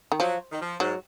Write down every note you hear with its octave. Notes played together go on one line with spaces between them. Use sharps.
D#3
F3 F#3
D#3
F3
G#2 F#3